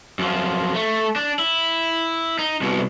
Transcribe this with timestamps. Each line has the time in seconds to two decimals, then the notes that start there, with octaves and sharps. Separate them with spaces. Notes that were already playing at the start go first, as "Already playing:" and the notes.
0.19 F#2 F3
0.75 A3
1.16 D4
1.39 E4
2.39 D#4
2.61 C2 B2